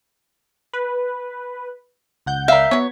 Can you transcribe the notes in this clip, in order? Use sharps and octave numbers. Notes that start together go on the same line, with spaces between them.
B4
C#2 F#5 G6
A#4 E5 F5
F#3 B3 C#5